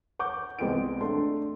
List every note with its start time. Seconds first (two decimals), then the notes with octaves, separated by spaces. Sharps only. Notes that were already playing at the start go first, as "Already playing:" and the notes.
0.19 F#5 C#6 D6 G6
0.59 C2 G#3 B3 C4 G5 D7
1.01 A3 D4 C6